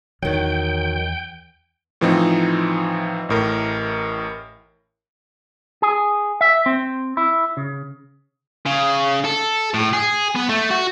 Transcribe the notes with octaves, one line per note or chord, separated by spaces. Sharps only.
E2 D#3 F#3 G5
A2 E3 F3 C4 D#4
A1 A2 A#4
G#4
E5
C4
E4
C#3
C#3
A4
A2
G#4
B3
A3
F#4